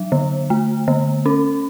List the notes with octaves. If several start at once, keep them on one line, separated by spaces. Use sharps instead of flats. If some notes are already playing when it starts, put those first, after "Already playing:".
Already playing: F#3
D3
A3
D3
C#4